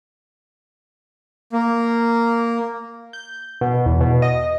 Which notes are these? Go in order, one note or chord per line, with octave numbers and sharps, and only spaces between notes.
A#3
G6
B2
E2
B2
D#5